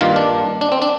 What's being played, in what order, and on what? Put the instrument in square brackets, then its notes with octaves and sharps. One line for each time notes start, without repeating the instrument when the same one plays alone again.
[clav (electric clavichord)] G2 D#3 A#3 F4
D4
D4
C4
D4